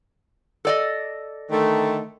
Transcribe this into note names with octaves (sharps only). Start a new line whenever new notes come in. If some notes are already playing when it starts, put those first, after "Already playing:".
A4 D5 D#5
D3 D#3 A3